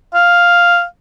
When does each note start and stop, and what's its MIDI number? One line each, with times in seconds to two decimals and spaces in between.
0.14 0.84 77